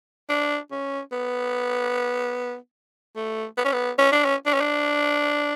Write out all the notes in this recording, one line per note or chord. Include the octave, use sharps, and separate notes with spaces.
D4
C#4
B3
A3
B3
C#4
B3
C#4
D4
C#4
D4
C#4
D4